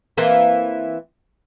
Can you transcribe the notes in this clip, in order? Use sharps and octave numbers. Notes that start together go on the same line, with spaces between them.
E3 A#3 C4